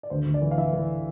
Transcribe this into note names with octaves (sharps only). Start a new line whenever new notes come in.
D5
D2 C5
D2
D5
E3
F5
E3 E5
E3